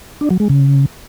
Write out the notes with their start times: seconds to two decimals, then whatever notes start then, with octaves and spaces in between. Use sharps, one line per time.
0.21 D4
0.30 F#3
0.40 G#3
0.49 C#3